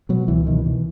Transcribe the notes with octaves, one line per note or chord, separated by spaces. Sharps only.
B2 F#3
C#2 E3
B2 D#3
B2 E3